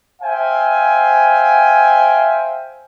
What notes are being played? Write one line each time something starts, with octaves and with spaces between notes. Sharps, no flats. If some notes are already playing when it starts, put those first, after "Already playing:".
C5 E5 F5 G5 G#5